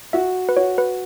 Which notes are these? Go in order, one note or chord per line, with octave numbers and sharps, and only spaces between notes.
F#4 E5
B4
F#4 C#5
B4